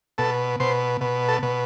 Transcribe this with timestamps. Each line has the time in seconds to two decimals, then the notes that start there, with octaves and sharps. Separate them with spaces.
0.18 B2 A4
0.60 B2 C5
1.01 B2
1.28 A4
1.43 B2